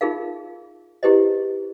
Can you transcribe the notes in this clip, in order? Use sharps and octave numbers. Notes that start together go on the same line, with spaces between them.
D#4 F4 G#4 A#4 F5
E4 G4 G#4 B4 C5 D#5